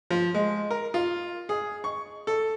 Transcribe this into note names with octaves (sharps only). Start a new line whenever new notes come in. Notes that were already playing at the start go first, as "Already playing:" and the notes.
F3
G#3
A#4
F4
G#4
C#6
A4